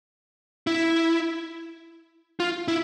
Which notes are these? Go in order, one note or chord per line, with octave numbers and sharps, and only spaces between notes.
E4
F4
E4